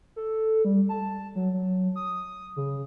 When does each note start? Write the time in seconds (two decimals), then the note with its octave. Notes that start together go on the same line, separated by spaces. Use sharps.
0.16 A4
0.65 G3
0.89 A5
1.35 F#3
1.53 F#3
1.96 D#6
2.56 C#3